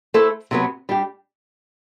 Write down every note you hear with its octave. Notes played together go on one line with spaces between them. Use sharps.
A3 E4 A4 C5
C3 F#3 B3
G3 D4 G4